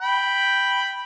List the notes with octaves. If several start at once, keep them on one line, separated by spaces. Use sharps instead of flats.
G5 B5